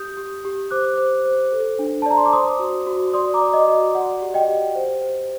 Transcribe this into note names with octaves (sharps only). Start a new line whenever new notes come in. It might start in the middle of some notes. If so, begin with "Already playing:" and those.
Already playing: G4 D#6 G6
G4
G4
C5 D6 F#6
C5
C5
A4
D4
A5
D5 A#5
C6
D6
C5 C6 D#6
F#4
F#4
D5 C6 D#6
A#5 D6
D5
D#5
F#4
D5 F#5
G4
D#5 G5
G4
C5
C5